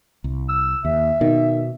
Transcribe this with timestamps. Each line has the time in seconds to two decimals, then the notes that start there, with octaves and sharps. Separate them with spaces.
0.24 C2
0.49 E6
0.85 D#2 E5
1.21 B2 D#3